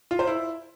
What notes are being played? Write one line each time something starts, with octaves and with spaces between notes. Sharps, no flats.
F4
C5
E4